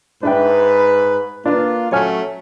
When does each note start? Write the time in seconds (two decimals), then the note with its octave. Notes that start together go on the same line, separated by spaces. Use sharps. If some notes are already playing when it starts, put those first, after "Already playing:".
0.23 G#2 D4 B4 E5 G5
1.46 A#3 D4 F4 B4
1.92 F#3 A3 C#4 C#5 G#5 F6